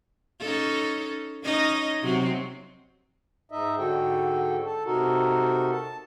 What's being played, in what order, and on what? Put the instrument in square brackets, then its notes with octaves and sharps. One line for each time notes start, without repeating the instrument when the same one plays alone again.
[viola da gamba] C#4 D#4 A4
C#4 D#4 D#5
C3 F#3 C4
[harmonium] G#2 D#4 D#5 E5
G#2 D3 F#4 A4 G5
A4 A5
C3 D#4 F#4 A4 A#4
A5